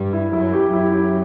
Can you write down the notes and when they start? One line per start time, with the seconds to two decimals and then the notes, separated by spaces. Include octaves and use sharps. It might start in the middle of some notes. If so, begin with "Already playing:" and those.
Already playing: G2 G3
0.13 E4
0.33 F#2 F#3 E4
0.53 G4
0.73 F#2 F#3 E4
0.93 G4